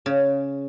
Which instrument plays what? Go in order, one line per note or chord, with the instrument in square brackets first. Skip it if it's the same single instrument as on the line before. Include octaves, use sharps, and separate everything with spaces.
[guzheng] C#3